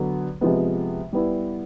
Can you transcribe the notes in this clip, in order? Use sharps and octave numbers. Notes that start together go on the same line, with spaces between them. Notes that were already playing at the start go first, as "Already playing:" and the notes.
Already playing: D3 F#3 B3
C3 F3 G#3 B3
G3 B3 E4